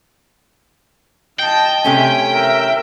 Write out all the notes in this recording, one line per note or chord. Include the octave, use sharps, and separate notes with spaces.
D#5 G5 A5
C3 A3 C#4 G#5
A#4 E5